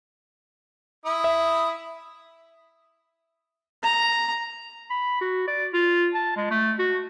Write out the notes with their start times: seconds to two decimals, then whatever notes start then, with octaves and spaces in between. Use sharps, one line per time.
1.06 E4 D#6
1.24 E5
3.83 A#5
4.90 B5
5.21 F#4
5.47 D5
5.73 F4
6.14 A5
6.36 G#3
6.51 A3
6.79 F#4